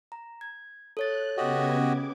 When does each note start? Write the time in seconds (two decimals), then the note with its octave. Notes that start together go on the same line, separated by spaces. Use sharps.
0.12 A#5
0.41 G#6
0.97 A4 C#5 F#6 A6
1.37 C#3 B3 F#4 G4 D#5 G#6
1.77 C#4 D6